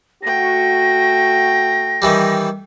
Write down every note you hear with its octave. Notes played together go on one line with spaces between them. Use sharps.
A3 F#4 G5 A#6
D#3 E3 G3